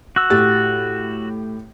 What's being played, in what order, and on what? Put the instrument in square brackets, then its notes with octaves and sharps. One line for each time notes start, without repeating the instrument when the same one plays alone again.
[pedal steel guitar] F#4 E6
[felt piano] A2 G4 A6